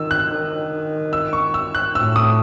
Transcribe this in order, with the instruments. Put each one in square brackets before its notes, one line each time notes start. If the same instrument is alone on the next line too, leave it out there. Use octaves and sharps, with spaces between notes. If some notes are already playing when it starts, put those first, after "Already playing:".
Already playing: [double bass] D#3 [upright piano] E6
[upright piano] F#6
[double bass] D#3
[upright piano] E6
C#6
E6
F#6
[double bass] A2 [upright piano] E6
[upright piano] D#6